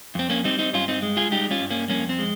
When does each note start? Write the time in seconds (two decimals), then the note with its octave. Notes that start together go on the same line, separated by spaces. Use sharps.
0.15 F2 C4
0.30 A#3 C#4
0.44 G3 C4 D#4
0.59 C4 D#4
0.73 G2 C#4 F4
0.88 C4 D#4
1.02 G#3
1.17 F4 G#4
1.32 G3 D#4 G4
1.51 C#4 F4
1.61 G2
1.70 A#3 C#4
1.89 F2 A#3 C#4
2.09 C4
2.19 G#3